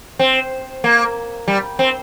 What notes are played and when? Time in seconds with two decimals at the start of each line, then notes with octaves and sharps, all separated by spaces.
0.19 C4
0.84 A#3
1.48 G3
1.79 C4